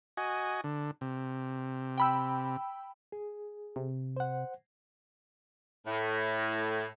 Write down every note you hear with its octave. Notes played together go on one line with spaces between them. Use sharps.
F#4 D#5 G#5
D3
C3
G5 B5 E6
G#4
C3
C5 F#5
A2